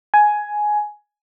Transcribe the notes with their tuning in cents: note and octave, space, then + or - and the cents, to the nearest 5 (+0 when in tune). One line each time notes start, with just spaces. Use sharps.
G#5 +10